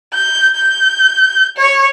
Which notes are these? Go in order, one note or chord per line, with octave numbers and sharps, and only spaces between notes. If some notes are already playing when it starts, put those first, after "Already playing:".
G6
G6
C#5